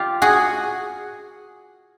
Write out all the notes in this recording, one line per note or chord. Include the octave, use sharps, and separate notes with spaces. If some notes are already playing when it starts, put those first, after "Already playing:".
Already playing: F4 G4
F#4 G#4